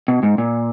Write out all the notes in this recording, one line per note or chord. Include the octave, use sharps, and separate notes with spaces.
B2
G#2
A#2